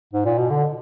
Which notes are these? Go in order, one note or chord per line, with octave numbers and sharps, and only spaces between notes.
G#2
A#2
B2
D3